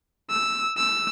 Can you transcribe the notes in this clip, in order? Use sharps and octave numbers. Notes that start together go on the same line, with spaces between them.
E6
E6